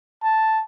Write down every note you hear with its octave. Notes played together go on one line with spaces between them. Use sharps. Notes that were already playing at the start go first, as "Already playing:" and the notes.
A5